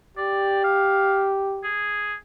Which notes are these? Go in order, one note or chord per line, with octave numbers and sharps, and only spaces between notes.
G4 D5
F5
G#4